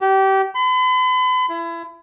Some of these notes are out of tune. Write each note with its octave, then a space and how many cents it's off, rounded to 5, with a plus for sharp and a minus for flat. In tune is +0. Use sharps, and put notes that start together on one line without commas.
G4 -25
B5 +45
E4 +30